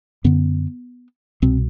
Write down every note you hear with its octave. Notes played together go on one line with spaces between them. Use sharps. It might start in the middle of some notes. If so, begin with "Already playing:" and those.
F#2 D3 B3
C2 B2 C4